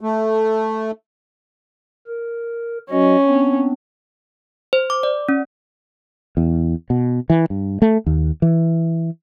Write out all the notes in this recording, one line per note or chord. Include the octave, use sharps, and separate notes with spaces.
A3
A#4
F#3 C#4 F#4 D#5
B3 C4 D4
C5
D6
D5
C#4
E2
B2
E3
G2
A3
D#2
E3